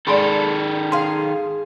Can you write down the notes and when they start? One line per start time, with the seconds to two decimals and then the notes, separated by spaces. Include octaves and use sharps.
0.07 G#2 D#3 G#3 G#4 A4 D5 B5 C6
0.92 G#4 F5 C6